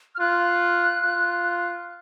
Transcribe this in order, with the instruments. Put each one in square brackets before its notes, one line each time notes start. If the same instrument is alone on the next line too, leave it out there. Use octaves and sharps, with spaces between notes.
[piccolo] F6
[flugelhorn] F4 [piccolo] F#6
[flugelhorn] F4